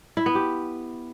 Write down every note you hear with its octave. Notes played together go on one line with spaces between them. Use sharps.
E4
B3
G4